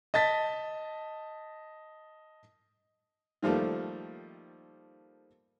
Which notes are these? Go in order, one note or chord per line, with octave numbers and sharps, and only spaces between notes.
D#5 A5 A6 B6
D#3 F3 G3 A3 A#3